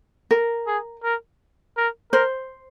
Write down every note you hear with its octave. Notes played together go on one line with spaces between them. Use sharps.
A#4
G#4
A#4
A#4
A#4 C5